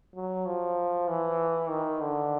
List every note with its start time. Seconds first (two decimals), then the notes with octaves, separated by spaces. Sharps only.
0.15 F#3
0.46 F3
1.09 E3
1.70 D#3
2.01 D3